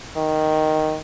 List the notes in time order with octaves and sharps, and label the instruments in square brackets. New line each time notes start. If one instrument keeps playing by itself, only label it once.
[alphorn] D#3